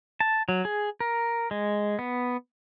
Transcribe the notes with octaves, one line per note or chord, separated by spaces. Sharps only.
A5
F#3
G#4
A#4
G#3
B3